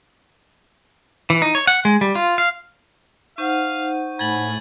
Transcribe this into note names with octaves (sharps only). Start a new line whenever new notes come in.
E3
D#4
C#5
F#5
G#3
G3
F4
F5
D#4 C5 F5 F#5 C#6 G6
A2 G#5 B5 G#6 A6 F#7